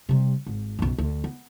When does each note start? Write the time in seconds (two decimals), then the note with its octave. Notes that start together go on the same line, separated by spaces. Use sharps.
0.09 C3 G3
0.47 G#1
0.79 B1 F#2
0.98 D2
1.24 B3